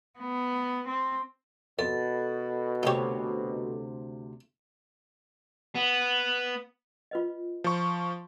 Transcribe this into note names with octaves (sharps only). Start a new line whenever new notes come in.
B3
C4
F2 B2 A4
D2 C3 D#4 G4 C#5
B3
F4 B4 D#5
F3 C#6